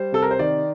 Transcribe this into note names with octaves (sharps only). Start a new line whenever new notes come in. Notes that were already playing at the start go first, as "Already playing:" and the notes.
Already playing: G3 C5
C3 A4
A#4
C5
D#3 D5